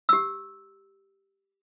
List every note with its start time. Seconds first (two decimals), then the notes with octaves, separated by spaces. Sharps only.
0.09 G4 E6